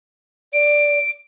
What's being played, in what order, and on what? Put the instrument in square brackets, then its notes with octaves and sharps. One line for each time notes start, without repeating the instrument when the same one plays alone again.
[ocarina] D5 [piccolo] D7